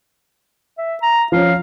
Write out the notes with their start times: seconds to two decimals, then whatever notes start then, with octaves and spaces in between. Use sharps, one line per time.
0.78 E5
1.02 A#5
1.32 F3 C#4 F5